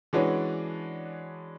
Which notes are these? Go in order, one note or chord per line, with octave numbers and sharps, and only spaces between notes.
E3 G#3 C#4 D4 F#4 B4